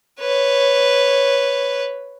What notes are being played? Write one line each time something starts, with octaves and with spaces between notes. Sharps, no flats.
B4 C#5